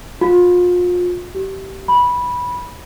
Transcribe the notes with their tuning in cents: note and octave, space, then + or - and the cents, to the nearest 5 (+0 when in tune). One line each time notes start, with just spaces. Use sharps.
F4 +35
G4 -20
B5 -10